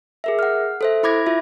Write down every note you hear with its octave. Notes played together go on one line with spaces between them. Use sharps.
G#4 A#4 E5
F#5 F6
A4 C5 E5
E4 B5 D6 G#6 A#6
E4 F4 E5